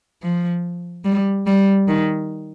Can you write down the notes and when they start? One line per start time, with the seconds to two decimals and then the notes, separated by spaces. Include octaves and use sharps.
0.23 F3
1.05 G3
1.47 G3
1.88 D#3